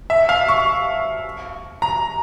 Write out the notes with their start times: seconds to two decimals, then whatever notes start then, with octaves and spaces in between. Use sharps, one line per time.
0.10 E5
0.29 F5
0.48 C#6
1.82 A#5